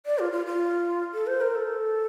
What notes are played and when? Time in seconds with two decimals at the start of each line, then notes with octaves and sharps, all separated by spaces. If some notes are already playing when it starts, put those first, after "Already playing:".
0.06 D5
0.19 F4
0.32 F4
0.46 F4
1.14 A4
1.27 C5
1.41 A#4
1.55 A4